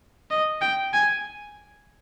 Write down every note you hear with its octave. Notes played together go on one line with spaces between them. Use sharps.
D#5
G5
G#5